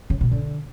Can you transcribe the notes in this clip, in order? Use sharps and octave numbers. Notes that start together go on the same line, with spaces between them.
C#3
B2
D3